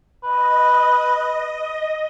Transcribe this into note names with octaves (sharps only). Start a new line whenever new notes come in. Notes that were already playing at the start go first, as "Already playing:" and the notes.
B4 D#5